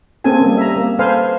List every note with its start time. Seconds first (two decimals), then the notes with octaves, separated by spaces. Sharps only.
0.24 A#3 C4 C#4 G#4 A4 G#5
0.42 G3 A#3
0.57 E5 A#5
0.76 A#3
0.99 A4 B4 C5 F5 G#5